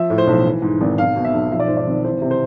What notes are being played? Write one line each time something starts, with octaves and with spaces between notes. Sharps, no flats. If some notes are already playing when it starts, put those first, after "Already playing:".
Already playing: F3 E5
A2
C5
B1
E3
G#2
G#1
B1 F5
B2
E5
B1
F3 E5
D5
G#2 C5
D5
G#1
E3 C5
C3
C5